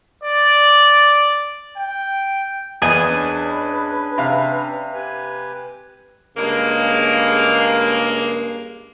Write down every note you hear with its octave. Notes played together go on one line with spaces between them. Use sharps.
D5
G5
E2 A#3 G#4 B4 D#5 G#5 D#6
C#4 D4
C3 F5
G4 B4 G#5
G2 C#3 G#3 A#3